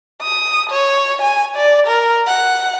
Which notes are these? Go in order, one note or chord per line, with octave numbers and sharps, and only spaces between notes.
D#6
C#5
G#5
D5
A#4
F#5